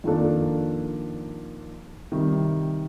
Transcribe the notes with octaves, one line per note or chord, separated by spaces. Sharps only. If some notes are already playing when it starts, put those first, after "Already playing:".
F2 D#3 A#3 D4 A4
C3 D#3 G3